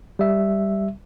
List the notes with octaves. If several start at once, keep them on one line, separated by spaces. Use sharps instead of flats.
G3 E5